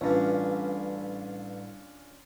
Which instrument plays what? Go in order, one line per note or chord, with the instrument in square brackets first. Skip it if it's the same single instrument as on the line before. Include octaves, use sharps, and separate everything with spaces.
[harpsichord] A1 G2 [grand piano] C#4 D4 F4